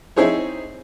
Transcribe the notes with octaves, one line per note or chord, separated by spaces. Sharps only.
C4 D#4 E4 G#4 C5 C#5